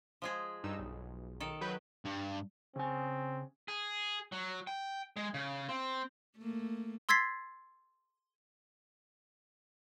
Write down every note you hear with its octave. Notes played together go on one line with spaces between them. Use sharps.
F3 G#3 G#4
G2 D#4 E6
B1
D#3 A4
F#3 B4 G6
G2
C#3 C4 G#5
G#4
F#3
G5
G#3
C#3
C4
A3 A#3
C6 E6 G#6 A6 B6 C7